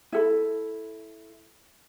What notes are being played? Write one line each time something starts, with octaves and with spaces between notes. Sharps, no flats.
E4 A4 B5